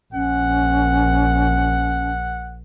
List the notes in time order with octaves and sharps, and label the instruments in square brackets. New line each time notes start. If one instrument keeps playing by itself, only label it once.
[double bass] A#1 [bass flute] C#4 [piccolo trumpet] F#5